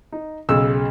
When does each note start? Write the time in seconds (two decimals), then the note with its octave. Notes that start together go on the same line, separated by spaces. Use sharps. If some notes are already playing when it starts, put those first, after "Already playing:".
0.12 D#4
0.49 B1 C#3 E6